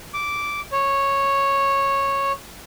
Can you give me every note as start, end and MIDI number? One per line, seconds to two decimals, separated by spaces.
0.14 0.61 86
0.72 2.32 73